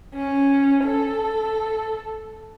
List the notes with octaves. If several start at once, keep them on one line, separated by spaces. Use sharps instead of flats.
C#4
A4